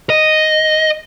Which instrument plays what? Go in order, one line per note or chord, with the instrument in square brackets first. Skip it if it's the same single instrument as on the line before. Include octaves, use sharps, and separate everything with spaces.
[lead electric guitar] D#5